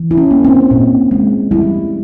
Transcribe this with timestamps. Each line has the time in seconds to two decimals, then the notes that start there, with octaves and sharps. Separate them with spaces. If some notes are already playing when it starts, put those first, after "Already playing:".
Already playing: E3
0.11 E4
0.17 C#4
0.31 A#3
0.45 C4
0.71 A#2
1.11 G#3
1.51 G3 E4